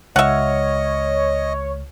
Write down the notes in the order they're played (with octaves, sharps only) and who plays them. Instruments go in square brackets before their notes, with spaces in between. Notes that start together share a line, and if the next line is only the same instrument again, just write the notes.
[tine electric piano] C#2 C#6 F6 [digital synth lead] C#5 [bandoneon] D#5 [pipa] E5 F#5